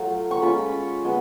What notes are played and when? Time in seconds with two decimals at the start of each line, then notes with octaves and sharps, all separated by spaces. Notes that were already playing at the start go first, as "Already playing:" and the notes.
Already playing: F#3 A3 F4
0.31 C#6
0.42 G#3 C#4 F4 B5
1.05 G#3 B3